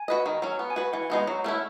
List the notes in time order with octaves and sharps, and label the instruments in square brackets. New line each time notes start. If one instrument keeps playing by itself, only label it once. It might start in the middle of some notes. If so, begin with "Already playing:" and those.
Already playing: [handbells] G#5
[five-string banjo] F#4 B4 D#5
D#3
F#3 C#4
[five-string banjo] B3 [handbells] F#5
[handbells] G#5
[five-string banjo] F#4 B4
[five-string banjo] E3 [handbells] F#5
[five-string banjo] G#3 B3 D#4 F#4
F#3
A3 C#4 E4